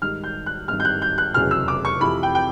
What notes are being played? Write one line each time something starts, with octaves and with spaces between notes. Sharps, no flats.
G#2 D#3 G3 F6
G6
F#6
G#1 G2 D#3 F6
G6
F#6
G6
F#6
F1 E2 C#3 F#3 F6
E6
D6
C#6
F2 C3 E3 B5
G5
G5